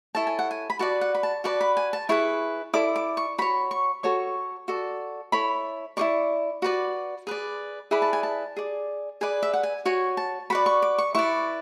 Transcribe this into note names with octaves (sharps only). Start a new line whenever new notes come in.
E4 A4 C#5 A5
G#5
F#5
G#5
B5
F#4 B4 D5 A5
F#5
B5
A5
F#4 B4 D5 A5
B5
G#5
A5
E4 G#4 B4 C#6
E4 A4 D5 D6
D6
C#6
F#4 C#5 B5
C#6
F#4 A4 C#5 C#6
F#4 A4 D5
E4 A4 C#5 B5
E4 G#4 D5 C#6
F#4 B4 D5
G#4 B4 D5
E4 G#4 B4 D5 B5
A5
G#5
A5
G#4 D5
G#4 B4 D5 G#5
E5
F#5
G#5
F#4 C#5 G#5
A5
F#4 B4 D5 B5
C#6
D6
C#6
E4 B4 D5 C#6